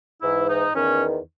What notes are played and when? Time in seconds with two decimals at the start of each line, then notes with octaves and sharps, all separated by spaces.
0.21 G#2 E3 E4
0.48 D#4
0.75 E2 D#3 C#4